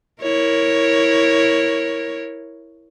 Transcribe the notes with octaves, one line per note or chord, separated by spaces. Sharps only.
E4 A#4 C#5